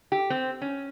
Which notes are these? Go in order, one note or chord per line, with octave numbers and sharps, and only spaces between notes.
G4
C4
C#4